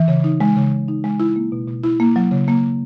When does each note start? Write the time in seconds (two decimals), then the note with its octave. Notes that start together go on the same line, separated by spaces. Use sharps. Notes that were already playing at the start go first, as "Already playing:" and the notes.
Already playing: E3
0.08 C#3
0.24 D#4
0.40 G#3
0.56 C#3
0.72 C#3
0.88 D#4
1.04 G#3
1.20 E4
1.36 A#3
1.52 B2
1.68 B2
1.84 E4
2.00 A#3
2.16 F#3
2.31 C#3
2.48 A#3